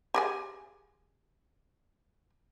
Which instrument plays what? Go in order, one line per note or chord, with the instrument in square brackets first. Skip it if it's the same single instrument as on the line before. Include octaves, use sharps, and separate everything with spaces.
[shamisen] G4 G#4 G#5